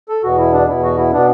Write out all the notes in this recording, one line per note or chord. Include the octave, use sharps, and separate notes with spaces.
A4
E2 B2 B3 F#4
E4
D4
E2 B2 B3 E4
F#4
E4
B2 B3 D4